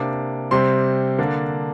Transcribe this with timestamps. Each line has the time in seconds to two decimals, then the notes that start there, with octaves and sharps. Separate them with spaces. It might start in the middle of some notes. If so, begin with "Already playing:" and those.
Already playing: C3 A#3 D4 D6
0.51 C3 G3 C4 C6
1.19 D3 A#3 D4